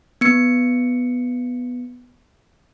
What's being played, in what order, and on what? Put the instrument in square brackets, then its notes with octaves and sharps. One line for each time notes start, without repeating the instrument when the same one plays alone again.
[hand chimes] B3 C#7